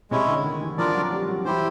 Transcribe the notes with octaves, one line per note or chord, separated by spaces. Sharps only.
C3 G#3 C#4 E4
D3
D#3
E3
F3 D4 F4 A#4 D5
F#3
G3
F#3
E3 E4 G4 C5